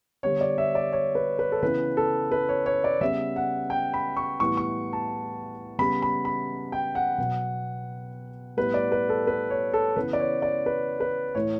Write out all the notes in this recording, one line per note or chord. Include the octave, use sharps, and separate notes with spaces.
D3 G3 B3 C#5
D5
E5
D5
C#5
B4
B4
A4
C#3 E3 B3 B4
A4
B4
C#5
C#5
D5
C#3 G3 B3 E5
F#5
G5
B5
C#6
A2 E3 G3 B3 C#6
C#6
A5
C#3 G3 B3 B5
B5
B5
G5
F#5
B2 F#3 B3
A2 G3 B3 B4
D5
B4
A4
B4
C#5
A4
C#3 E3 B3 B4
D5
C#5
D5
B4
B4
A2 E3 A3 C#5